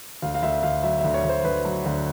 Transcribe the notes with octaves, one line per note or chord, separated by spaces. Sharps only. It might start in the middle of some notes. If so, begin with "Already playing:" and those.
D2 F5
F5
D2 E5
D2 F5
F#3 E5
E5
D2
C#5
D2 C5
D2 B4
F#3
D2